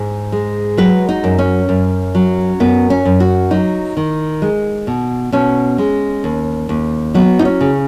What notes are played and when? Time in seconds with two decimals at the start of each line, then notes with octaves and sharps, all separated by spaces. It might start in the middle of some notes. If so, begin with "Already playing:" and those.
Already playing: G#2
0.32 G#3
0.77 F#3 B4
1.09 D#4
1.24 F#2
1.39 C#4
1.69 F#2
2.15 F#3
2.60 F#2 B3
2.90 C#4
3.05 F#2
3.20 F#4
3.51 F#3 D#4
3.97 D#3
4.42 G#3
4.87 B2
5.32 B2 C#4
5.78 G#3
6.24 D#2
6.69 D#2
7.14 F#3 B3
7.39 D#4
7.45 C#4
7.61 C#3